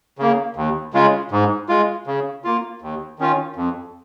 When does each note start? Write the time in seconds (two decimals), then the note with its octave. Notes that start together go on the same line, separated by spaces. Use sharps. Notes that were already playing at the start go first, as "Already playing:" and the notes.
0.18 C#3 A#3
0.56 D#2
0.93 C#3 G#3 F4
1.31 G#2
1.69 G#3 F4
2.07 C#3
2.44 A#3 F4
2.82 D#2
3.19 D#3 C#4 F4
3.56 F2